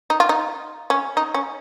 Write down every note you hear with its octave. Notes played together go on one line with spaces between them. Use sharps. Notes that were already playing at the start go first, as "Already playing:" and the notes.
D#4
F4
D#4
C#4
D#4
C#4